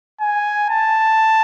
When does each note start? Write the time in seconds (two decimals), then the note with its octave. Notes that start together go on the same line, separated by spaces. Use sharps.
0.21 G#5
0.70 A5